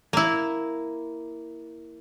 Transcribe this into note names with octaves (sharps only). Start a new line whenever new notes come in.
A#3 E4